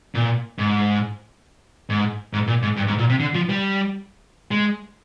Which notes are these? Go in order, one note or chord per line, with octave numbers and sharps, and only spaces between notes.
A#2
G#2
G#2
G#2
A#2
G#2
G2
G#2
A#2
C3
D3
F3
G3
G#3